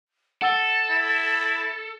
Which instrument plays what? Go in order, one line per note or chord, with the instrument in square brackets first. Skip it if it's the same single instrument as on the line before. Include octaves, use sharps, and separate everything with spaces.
[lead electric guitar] A4 [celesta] F#5 E6 G7 [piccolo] A6
[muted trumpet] E4